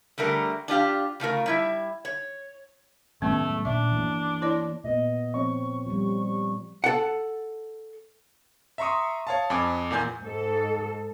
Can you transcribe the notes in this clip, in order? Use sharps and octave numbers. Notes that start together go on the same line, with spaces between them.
D3 G3 A3 A#4
D4 F4 G4 F5
C#3 A3 F4 A#4
G3 E4 E5
C#5
A2 D#3 F#3 G#3 A3 B3 C#4
A#2 D4 E5
E3 A#3
E4 C#5 D5
A#2 B3 D#5
F3 C4 C#5 C#6
F3 G3
A4 F#5
E5 A#5 C6 C#6 D#6
C#5 F5 A5
F2 G#5 D6
E2 A#2 G#5 G6
G#2 A4